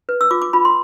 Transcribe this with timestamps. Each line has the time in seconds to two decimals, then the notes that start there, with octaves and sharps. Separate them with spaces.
0.09 B4
0.21 E6
0.31 F4 D6
0.42 D6
0.53 F4 B5
0.65 C6